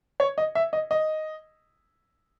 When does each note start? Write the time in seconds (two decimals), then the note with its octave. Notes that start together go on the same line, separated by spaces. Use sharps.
0.20 C#5
0.38 D#5
0.55 E5
0.73 D#5
0.91 D#5